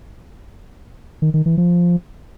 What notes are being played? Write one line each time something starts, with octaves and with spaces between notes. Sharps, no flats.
D#3
D#3
E3
F3